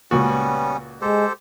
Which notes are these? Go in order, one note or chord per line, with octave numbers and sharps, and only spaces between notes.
C#2 A#2 G3 B3 C#4 F#4
G#3 G4 A4 C5